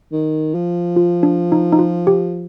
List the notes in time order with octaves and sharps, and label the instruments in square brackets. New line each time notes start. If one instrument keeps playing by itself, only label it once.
[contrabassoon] D#3
F3
[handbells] F4
D4
D#4
D#4
F4
G4